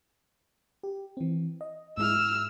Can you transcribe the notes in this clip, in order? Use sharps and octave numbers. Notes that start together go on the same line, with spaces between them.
G4
E3 C4
D#5
G#2 G#3 E4 E6 F6